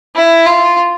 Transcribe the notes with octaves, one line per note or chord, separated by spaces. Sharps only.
E4
F4